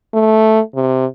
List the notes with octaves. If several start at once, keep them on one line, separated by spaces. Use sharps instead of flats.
A3
C3